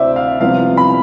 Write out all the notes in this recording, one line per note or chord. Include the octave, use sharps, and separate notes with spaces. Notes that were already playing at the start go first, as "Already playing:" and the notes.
Already playing: D2 C3 C5 D5 E5
F5
C2 C3 F3 B3 F5
B5